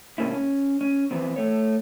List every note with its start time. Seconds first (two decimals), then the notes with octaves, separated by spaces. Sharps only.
0.18 G#2 C3 G#3 A#3 C#4 E4
0.33 C#4
0.81 C#4
1.11 E3 B3 C4
1.36 A3 C#5